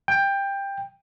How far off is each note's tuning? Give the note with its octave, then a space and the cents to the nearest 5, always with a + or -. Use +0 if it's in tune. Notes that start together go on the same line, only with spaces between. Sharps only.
G5 +15